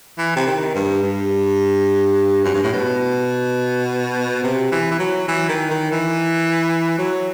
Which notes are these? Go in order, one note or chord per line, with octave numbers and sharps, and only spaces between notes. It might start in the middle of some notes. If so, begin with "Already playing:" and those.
E3
C3
D#3
G2
G2
F#2
G2
A2
B2
C3
E3
E3
F#3
E3
D#3
D#3
E3
F#3